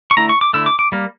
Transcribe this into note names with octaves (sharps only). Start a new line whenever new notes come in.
C#6
D3 A3 E4 A#5
C#6
D6
D3 A3 E4 E6
D6
D6
G3 A#3